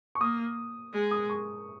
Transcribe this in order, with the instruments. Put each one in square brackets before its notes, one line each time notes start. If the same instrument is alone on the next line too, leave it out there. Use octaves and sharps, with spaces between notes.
[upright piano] C#6
[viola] A#3 [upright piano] D#6
[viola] G#3
[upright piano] D#6
C#6